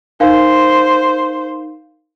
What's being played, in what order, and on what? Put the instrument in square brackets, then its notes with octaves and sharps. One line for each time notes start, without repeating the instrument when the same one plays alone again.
[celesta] D#4 A#4 F5 [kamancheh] C5